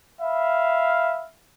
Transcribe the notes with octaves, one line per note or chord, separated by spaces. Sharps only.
E5 F5 B5